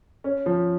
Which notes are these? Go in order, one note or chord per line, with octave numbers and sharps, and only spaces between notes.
C#4
F3